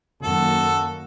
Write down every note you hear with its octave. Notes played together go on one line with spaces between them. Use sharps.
F#2 D#3 A#3 F#4 A4